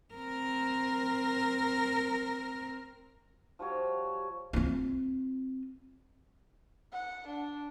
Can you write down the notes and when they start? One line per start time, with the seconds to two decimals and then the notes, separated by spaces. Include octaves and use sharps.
0.14 C4 A#4
3.59 F3 G3 F#4 C#5
4.53 C4 F4
6.92 F#5
7.28 D4